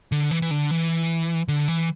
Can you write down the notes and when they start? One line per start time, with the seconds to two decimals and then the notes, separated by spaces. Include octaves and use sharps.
0.12 D3
0.31 E3
0.42 E3
0.51 D3
0.71 E3
1.48 D3
1.68 E3